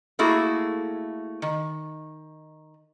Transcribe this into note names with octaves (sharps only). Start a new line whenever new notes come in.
A3 A#3 E4 F#4 G#4
D#3